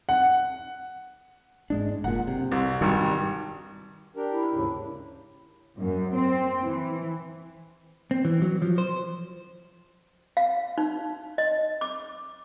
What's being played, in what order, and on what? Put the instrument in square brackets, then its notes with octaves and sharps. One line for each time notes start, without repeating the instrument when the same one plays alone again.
[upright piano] F#5
[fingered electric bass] G#2 G#3 D4
[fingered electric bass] F#1 A#2 [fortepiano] F#5
[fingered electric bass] C3
[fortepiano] C2
[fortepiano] G#1 G2 [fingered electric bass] D#3 G3
[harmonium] D4 G4 A#4
[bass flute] E4
[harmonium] D#2 G#2 C#3
[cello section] F#2
C4
E3
[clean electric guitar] C4
E3
F#3
F3
C5
[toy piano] F5
D#4
D#5
D6